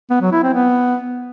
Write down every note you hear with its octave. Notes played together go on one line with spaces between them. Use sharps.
B3
F#3
E4
C4
B3